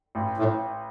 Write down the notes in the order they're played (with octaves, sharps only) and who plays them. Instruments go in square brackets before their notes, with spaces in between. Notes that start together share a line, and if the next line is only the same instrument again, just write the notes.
[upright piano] A1
[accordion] A2